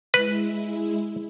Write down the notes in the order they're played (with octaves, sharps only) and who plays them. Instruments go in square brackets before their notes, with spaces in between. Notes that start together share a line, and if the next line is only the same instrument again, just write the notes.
[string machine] G#3 E4 [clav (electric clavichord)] B4